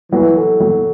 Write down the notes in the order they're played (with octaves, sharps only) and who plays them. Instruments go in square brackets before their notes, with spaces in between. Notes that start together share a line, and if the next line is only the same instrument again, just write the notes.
[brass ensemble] E3 [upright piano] F#3
[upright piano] A4
F#3